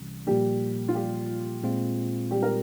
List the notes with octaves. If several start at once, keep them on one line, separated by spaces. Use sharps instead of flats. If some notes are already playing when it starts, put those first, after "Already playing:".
Already playing: C2 C3 E3 G3 C#4
A#2 F3 G3 A#3 G4
F4
G3 G4
A#2 G#3 C4 F4
G3 G4
A#4